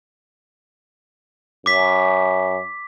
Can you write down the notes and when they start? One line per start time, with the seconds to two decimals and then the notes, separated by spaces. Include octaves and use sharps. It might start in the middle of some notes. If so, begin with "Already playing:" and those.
1.66 F#2 D6 B6